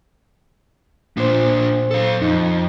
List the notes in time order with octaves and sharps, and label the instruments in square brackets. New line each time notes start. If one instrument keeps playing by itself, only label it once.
[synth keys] A#2 C5 [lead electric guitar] A#3 D4
[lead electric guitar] A4 F5
[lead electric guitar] F2 [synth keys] D#4